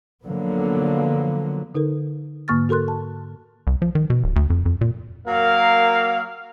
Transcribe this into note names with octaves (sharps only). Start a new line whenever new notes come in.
D3 F3 F#3 A#3 B3
D3 D#4 A4 A#4
G#2 D3 A#3 C#6 F6 A6
F#4 A4 A#4 C6 F#6
A5
C2
F3
D#3
B2
D1
D2
F2
F2
A#2
F#3 A#3 A#4 F5